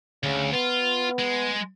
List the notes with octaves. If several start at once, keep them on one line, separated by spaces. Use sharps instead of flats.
D2 C#3
B3 F4
G#3